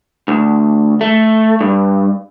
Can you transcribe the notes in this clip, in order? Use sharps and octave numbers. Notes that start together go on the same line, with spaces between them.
D2
A3
G2